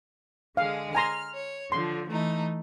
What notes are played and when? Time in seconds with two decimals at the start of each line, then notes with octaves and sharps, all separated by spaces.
0.57 D3 G#3 G#4 F5
0.95 G#5 A#5 C6 F6
1.35 C#5
1.72 D3 F3 C6
2.10 E3 A3 D#4